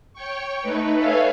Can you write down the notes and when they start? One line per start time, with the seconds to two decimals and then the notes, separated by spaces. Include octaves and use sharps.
0.14 C#5 G5 C#6
0.62 A3 D#4 B4
0.95 A4 B4 C#5 E5 F5 G#5